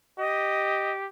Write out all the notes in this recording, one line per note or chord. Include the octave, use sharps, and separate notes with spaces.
G4 D#5